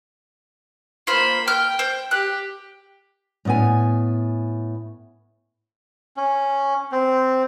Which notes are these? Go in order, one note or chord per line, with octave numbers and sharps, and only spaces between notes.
A#3 F4 C5 B5
G5 F6 G6
C5
G4 F#6
A2 B3 G#5
C#4
C4